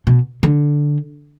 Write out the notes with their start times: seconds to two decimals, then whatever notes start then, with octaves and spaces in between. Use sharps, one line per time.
0.07 B2
0.43 D3